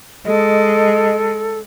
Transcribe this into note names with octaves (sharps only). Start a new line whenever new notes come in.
G#3 A4 D#5